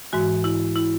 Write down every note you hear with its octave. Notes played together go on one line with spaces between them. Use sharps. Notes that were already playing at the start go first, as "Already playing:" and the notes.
G#2 E3 G#3 F#4
E4
E4